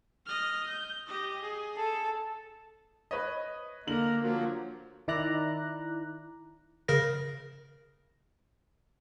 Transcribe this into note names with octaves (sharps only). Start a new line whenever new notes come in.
D#5 F6
G6
G4 D#5
G#4
A4
B4 C#5 D#5
D3 A#3 A#4 F#7
F3 F#3
D#3 E4 D5 A#5 F#6
C#3 A#4 A#6